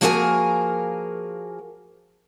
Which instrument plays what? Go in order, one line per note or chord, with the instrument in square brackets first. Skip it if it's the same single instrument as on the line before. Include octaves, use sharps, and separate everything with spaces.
[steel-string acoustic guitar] F3 A#3 F#4 G#4 A#4 G#5